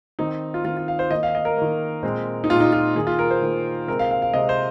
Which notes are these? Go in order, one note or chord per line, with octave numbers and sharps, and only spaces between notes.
D#3 C4 D#4
F4
D#3 C4 F4
F4
F5
C5
D#3 A#3 D#5
F5
D#5
A#4
D#3 A#3
A#2 G#3 C4
D#4
A#2 G#3 C4 F4
D#4
F4
D#3 A#3 G#4
F4
A#4
C5
D#3 A#3
C3 G#3 C4 A#4
F5
F5
F5
C3 G#3 C4 D#5
C5